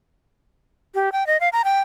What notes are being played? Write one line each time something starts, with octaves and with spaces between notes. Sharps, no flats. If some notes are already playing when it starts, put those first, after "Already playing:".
G4
G5
D#5
F5
A#5
G5